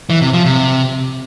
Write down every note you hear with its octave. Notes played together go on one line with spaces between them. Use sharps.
E3
C3
F3
C3